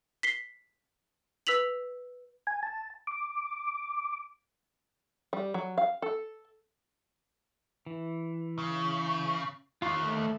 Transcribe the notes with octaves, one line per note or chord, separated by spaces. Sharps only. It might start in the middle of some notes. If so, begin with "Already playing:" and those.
B6 C7 G7
B4 E6 B6 F7 F#7
G#5
A5
D6
G3
F#3
F5
A4
E3
C#3
D#2 F4
A3